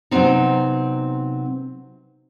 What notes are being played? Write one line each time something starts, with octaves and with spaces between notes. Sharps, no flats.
C3 F#3 G#3 B3 C4 D#4